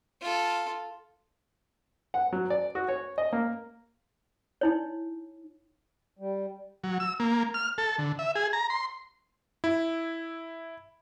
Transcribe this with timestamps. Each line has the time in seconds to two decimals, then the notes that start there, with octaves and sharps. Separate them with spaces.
0.21 F4 A4
2.14 F#5
2.33 F#3
2.50 D5
2.75 F#4
2.88 C#5
3.18 D#5
3.33 A#3
4.61 D#4 E4 C#5
6.19 G3
6.84 F#3
7.00 E6
7.20 A#3
7.54 F6
7.78 A4
7.98 D3
8.19 E5
8.35 G#4
8.53 A#5
8.70 C6
9.64 E4